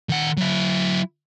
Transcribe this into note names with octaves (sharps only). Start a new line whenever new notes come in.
D#3 F#5
F#3 E4